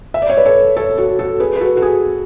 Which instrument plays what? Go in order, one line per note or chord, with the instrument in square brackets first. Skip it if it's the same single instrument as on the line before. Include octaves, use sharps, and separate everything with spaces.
[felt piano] E5
D5
C#5
B4 D5
A4 C#5
A4 C#5
F#4 A4
F#4 A4
G#4 B4
B4
F#4 A4
F#4
G#4